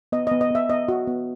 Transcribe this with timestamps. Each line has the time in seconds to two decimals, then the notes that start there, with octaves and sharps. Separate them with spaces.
0.12 B3 D#5
0.27 B3 D#5
0.41 D#5
0.51 B3 E5
0.69 B3 D#5
0.88 F#4
1.07 B3